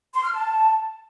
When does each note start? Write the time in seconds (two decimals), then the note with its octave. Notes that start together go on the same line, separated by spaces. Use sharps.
0.15 C6
0.24 F6
0.34 A5